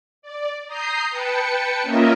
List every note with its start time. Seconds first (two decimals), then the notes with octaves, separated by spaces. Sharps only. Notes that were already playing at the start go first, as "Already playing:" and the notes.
0.22 D5
0.67 A#5 D#6 G6 C7
1.10 B4 G5 A5 C#7
1.82 A#3 C#4 F4 A#4 D#5 E5